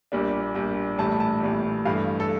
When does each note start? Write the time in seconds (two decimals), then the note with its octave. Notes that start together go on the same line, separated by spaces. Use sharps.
0.12 A#1 A#2 G3 D4
0.55 A#1 A#2 G3 D4
0.98 A#1 A2 E3 G3 A5
1.20 A5
1.42 A#1 A2 E3 G3
1.85 G2 E3 A3 F5
2.20 A4